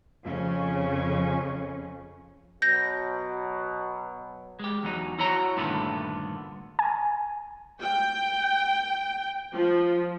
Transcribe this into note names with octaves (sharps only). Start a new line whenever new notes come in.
F2 C#3 C#4
B2 F#3 G6 A#6
G#3 G4
E2 F#3 D#4
E4 F#4 C#5 A#5
G2 A#2 D3 D#3 A3 B3
G#5
G5
F3